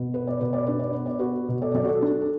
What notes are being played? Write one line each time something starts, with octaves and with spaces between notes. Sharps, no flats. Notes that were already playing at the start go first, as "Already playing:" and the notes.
Already playing: B2
B3 B4
D5
B2 B4
D5
D4 B4
D5
B3 B4
D5
B3 F#4 B4
B2
A4 D5
F#3 A4 D5
F#4
A4
D4
A4